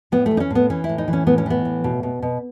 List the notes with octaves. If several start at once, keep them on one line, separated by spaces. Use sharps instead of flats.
A2 B3
A3
E3
D#4
C#4
A2 B3
E3 C#4
E4
A2
D#4
E3
C#4
A2 B3
C#4
E3 B3
A2
B2
B2
B2